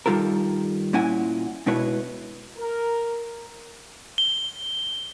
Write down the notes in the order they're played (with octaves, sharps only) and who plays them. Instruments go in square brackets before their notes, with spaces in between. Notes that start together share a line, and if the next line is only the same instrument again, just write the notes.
[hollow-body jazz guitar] G2 D#3 G3 F4 A4 A#4
A#2 C#4 E4 F#5 G#5
G#2 B2 D4 E4 B4 C#5
[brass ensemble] A#4
[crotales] G7